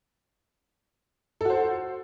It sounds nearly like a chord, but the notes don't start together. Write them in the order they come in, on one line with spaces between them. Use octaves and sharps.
A4 F#4 C5